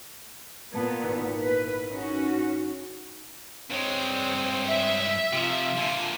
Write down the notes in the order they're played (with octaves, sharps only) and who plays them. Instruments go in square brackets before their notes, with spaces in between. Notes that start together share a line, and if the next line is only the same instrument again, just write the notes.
[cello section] A#2 B3 [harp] A5 G#6
[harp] G#1 E4 F#4
[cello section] B4
[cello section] C#4 F#4 [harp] D#4
[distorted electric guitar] G2 G#3 [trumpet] C4 [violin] C5 C#5
[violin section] E5
[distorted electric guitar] C3 F3 [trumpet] F4
[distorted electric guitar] A#2 D3 [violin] G#5 A5